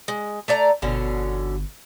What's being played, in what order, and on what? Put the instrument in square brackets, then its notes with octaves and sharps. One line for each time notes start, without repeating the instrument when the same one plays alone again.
[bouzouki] G#3
A3 D5 A#5
[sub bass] G1 [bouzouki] B2 D3 C#4